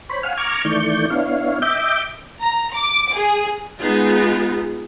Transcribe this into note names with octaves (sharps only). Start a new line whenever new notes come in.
C5 C#5 B5
F5 F#5 G#5 F6
A#5 C#6 D6 F6 G#6
D#3 E3 A3 D5 C#6 G6
B3 D4 E4 C#5 F5
D#5 E5 G5 D6 G6
A#5
D6
G#4
G#3 B3 D#4 F4 G#4